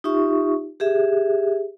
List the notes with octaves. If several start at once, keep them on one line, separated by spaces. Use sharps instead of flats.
D#4 F4 G4 E5 C#6
G4 G#4 E5